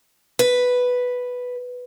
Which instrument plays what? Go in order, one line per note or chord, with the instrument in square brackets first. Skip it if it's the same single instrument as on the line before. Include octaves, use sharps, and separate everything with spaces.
[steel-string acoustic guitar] B4